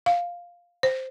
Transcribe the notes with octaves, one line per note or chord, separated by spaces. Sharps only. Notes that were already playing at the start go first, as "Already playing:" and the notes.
F5
C5